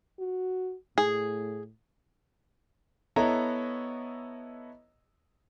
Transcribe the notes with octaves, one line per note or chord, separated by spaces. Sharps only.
F#4
A2 G#4
B3 E4 A4 C#5 D#5 A#5